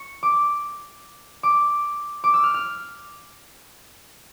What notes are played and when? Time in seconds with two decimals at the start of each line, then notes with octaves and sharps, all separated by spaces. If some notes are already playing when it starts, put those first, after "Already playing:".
Already playing: C#6
0.23 D6
1.43 D6
2.24 D6
2.34 E6
2.44 F6
2.54 F6